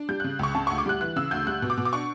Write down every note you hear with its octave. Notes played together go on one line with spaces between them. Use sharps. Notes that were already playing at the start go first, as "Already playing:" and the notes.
Already playing: D4
G3 G6
C#3 F#6
C#2 C#6
C#3 A5
D2 C#6
D6
G3 F#6
E3 F#6
C#3 E6
D2 G6
G3 F#6
B2
D6
B2
D6
D4 C#6